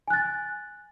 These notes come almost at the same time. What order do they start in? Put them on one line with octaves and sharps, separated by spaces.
G#5 F#6 A6